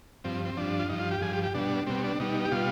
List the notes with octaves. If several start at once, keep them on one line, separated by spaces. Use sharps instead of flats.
G2 F3 C4
C4
G2 F3 D4
F4
G2 F3 D#4
F4
G4
G2 F3 G#4
G4
G4
B2 G3 D4
B2 G3 C4
D4
B2 G3 D#4
G4
B2 G3 F4